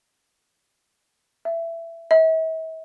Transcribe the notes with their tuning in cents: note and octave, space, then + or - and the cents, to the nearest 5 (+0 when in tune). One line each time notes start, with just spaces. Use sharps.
E5 +15
E5 -40